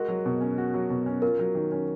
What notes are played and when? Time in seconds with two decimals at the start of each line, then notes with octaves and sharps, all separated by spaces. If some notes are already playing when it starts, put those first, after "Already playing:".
Already playing: G#3 F#4 A#4
0.08 F#3
0.26 B2
0.41 C#4
0.58 F#4
0.74 F#3
0.90 B2
1.06 C#4
1.22 F4 A#4
1.39 F#3
1.55 D#3
1.72 C#4